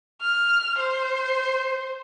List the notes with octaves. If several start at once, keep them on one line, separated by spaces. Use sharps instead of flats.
F6
C5